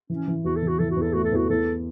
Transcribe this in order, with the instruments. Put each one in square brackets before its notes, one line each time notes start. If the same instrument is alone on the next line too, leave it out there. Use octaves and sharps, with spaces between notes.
[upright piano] E3 [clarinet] C#4
[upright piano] E3
[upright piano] E2 [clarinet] F#4
[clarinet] A4
[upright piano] E3
[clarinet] F#4
[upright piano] E3 [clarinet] A4
[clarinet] F#4
[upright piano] E2
[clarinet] A4
[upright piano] A3 [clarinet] F#4
[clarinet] A4
[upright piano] E2 [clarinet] F#4
[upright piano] E2 [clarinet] A4